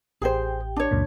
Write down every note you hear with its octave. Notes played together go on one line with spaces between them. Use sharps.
A1 G4 G#4 C5 G5
D4 C#5
C#2 F#2 A#2